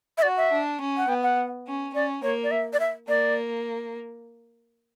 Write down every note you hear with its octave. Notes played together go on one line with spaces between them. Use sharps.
E5
F#4 D5
E5
D4
C#4
F#5
B3 G5
F#5
C#4
C#4 D5
A#3 C#5
D5
E5
D5
E5
A#3 D5